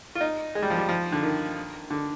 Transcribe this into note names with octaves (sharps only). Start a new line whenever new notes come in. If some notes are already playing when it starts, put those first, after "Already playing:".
F4
D#4
G#3
G3
F3
G3
F3
D3
D#3
D3